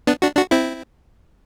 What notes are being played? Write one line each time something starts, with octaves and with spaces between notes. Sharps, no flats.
B3 D4
D4 F#4
D4 F#4
C4 E4